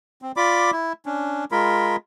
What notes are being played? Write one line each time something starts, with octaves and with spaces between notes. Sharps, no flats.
C4
F4 D5 B5 D6
E4
C#4 D4
G#3 F4 A#4 B5